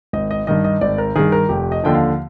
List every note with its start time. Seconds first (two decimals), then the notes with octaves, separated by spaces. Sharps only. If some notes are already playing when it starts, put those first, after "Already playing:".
0.13 G#1 D#5
0.31 D#5
0.47 G2 D#3 D#5
0.64 D#5
0.81 G#1 D5
0.98 A#4
1.16 G2 D#3 G#4
1.32 A#4
1.49 F1 G4
1.72 D#5
1.83 D#2 D3 F3 G5
1.94 F5